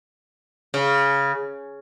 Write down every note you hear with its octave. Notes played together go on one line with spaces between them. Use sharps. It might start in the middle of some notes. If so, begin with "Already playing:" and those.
C#3